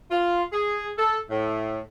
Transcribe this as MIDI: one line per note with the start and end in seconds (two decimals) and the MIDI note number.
0.11 0.44 65
0.52 0.91 68
0.98 1.19 69
1.30 1.81 45